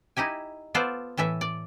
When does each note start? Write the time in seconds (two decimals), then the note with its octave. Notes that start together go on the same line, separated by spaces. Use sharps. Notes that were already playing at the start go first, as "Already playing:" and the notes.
0.17 D#4 E4 G4 G#5
0.75 B3 F4 A4 C5 D5
1.17 A2 E3 A4 E5
1.41 D5